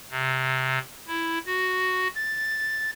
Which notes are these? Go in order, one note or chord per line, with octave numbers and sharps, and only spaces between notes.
C3
E4
F#4
A6